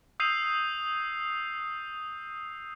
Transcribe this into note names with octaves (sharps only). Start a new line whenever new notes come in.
D#6 E6 G6 C7 D#7 F7